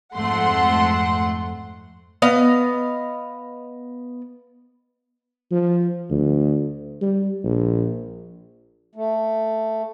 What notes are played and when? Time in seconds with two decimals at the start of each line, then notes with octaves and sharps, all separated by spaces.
0.16 F2 G#2 A3 F#5 C6
2.22 B3 D#5 F5
5.51 F3
6.10 D2
7.01 G3
7.44 A#1
8.95 A3